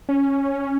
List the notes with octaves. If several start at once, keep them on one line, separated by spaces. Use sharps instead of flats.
C#4